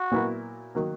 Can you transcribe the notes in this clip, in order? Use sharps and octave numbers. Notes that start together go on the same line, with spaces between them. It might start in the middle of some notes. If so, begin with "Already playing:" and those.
Already playing: F#4
A#2 F#3 B3 E4 A#4
D#3 F#3 A#3